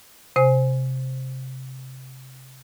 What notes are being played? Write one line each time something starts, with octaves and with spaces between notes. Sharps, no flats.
C3 C5 G#5